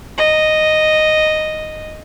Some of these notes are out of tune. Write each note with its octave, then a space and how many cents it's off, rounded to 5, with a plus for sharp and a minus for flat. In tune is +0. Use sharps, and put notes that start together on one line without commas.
D#5 -5